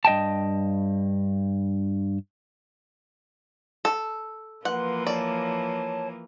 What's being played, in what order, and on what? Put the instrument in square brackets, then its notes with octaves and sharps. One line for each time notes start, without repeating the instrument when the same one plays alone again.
[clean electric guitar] G2 D#5 G5 A5
[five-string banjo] A4
[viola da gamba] E3 F3 A#3 [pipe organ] B4 C6 [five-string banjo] F#5
[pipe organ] C#5 A5 [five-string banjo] D5